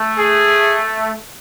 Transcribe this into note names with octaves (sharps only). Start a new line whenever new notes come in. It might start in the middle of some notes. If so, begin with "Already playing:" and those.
Already playing: A3
G#4